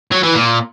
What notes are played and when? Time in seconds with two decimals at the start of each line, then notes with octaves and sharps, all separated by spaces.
0.12 F#3
0.23 E3
0.35 A#2